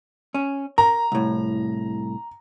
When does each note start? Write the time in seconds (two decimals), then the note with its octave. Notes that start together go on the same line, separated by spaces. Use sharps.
0.34 C#4
0.78 A#4 A#5
1.12 C2 A2